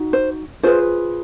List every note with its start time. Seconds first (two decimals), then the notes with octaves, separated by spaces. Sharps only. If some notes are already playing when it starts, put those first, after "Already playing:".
Already playing: D#4 F#4
0.13 C5
0.63 F4 G#4 B4 C5